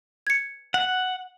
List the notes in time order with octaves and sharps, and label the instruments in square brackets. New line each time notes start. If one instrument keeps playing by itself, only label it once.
[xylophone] G#6 C#7
[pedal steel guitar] F#5